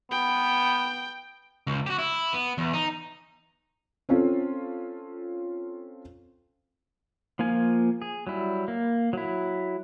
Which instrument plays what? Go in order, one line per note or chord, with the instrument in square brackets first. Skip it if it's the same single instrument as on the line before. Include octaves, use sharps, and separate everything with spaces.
[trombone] B3 [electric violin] G5
[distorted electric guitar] C#2
F#4 G4
E4
B3
E2
D#4
[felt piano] C4 C#4 F4 A4
[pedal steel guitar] F3 A#3 F4 G#5
G#4
F#3 G3 E4
A#3
F#3 E4